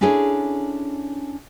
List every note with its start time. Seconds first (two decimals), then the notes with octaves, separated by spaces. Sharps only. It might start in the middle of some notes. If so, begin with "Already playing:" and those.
0.01 C#4 D4 E4 G#4 A4 C#5